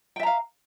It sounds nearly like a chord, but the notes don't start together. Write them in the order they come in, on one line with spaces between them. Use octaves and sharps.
G5 E5 A#5 F5